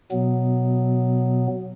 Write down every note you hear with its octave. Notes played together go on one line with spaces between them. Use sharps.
B2 F#3 B3